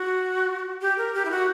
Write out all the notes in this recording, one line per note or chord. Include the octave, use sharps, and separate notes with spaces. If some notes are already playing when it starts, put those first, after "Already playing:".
Already playing: F#4
G4
A#4
G4
E4
F#4